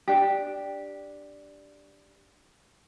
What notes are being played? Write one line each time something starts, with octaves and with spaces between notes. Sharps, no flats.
D4 G4